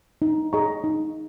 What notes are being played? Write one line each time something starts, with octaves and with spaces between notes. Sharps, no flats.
D#4
G#4 D#5 A#5 C#6
D#4